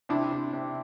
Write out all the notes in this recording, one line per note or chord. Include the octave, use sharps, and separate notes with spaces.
C3 D4 E4
C3
C3